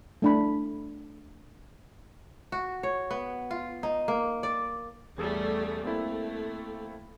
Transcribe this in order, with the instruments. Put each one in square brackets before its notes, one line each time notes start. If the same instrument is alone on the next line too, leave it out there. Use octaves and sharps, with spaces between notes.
[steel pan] A3 D4 B5
[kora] F#4
C#5
B3
F4
D#4
A#3
D5
[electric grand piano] E2 G#4 A4 [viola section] G3 A3 C#4
[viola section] A3 [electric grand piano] A#3 C4 E4